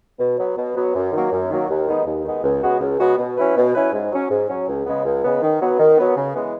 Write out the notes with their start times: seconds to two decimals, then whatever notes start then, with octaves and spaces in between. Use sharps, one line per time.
0.18 B2
0.37 F#3 B3
0.56 B2
0.75 F#3 B3
0.94 F#2
1.12 D#3 F#3 A#3
1.31 F#2
1.49 D#3 F#3 A#3
1.68 D#2
1.87 D#3 G#3 B3 D#4
2.05 D#2
2.24 D#3 G#3 B3 D#4
2.43 C#2
2.62 C#3 G#3 B3 F#4
2.80 C#2
2.99 C#3 G#3 B3 F#4
3.17 B2
3.36 F#3 C#4 E4 B4
3.55 B2
3.74 F#3 C#4 E4 B4
3.92 G#2
4.11 F#3 C#4
4.29 G#2
4.48 F#3 C#4
4.67 C#2
4.85 C#3 G#3 B3
5.04 C#2
5.23 C#3 G#3 B3
5.42 D#3
5.60 F#3 B3
5.79 D#3
5.97 F#3 B3
6.16 C#3
6.34 E3 G#3 B3